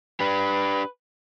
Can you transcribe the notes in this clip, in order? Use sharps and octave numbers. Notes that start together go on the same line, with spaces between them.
D4 G4 B4